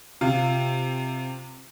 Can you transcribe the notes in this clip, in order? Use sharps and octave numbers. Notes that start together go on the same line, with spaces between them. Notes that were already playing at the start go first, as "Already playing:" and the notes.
C3 F4